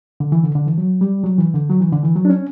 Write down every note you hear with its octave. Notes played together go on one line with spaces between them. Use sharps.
D3
E3
D3
D3
E3
F#3
G3
F#3
E3
D3
F#3
E3
D3
E3
F#3
D4
C#4